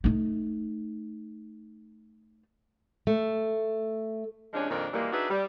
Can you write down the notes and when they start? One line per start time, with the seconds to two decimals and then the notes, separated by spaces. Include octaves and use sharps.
0.04 A3 D#4
3.07 A3
4.53 C3 F3 G#3 C#4 D4
4.70 F2 A#2 D#3 C4 D4
4.93 A#2 E3 G3 G#3 A#3
5.13 D4 D#4 F#4 G#4 B4 E5
5.30 G3